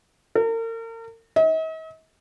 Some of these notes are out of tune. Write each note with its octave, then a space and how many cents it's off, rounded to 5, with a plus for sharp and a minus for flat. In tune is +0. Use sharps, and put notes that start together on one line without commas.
A#4 -40
D#5 +45